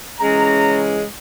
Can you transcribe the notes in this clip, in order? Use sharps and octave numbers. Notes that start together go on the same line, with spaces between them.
C#3 E3 G#3 C#4 A#5